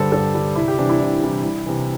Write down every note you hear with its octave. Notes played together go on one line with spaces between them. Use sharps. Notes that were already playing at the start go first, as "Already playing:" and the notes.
Already playing: G2 D3 G3 A4 C5
G2 A4
D3 G3
C2 E4
G4
C3 E3 G3 D4
E4
C2
C3 E3 G3
C2
C3 E3